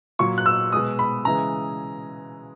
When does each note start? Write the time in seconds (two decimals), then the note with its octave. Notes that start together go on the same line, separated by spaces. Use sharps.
0.19 A#2 F#3 C#6
0.38 F#6
0.46 E6
0.72 B2 G#3 D#6
0.99 B5
1.25 C#3 E3 G#3 A#5